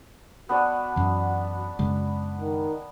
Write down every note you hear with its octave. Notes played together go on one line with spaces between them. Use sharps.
B3 D4 F#4 C#5
F#2 E3
F#2 C#3 G#3
D#3